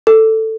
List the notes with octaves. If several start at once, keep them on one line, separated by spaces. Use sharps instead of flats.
A4